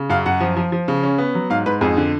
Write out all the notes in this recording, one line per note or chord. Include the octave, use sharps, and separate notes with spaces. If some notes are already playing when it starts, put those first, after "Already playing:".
Already playing: C#3
F#2 F5
F#2 F#5
F3
F3
F3
C#3
C#4
B3
F#3
G#2 F5
G#2 B4
F2 G#4
D3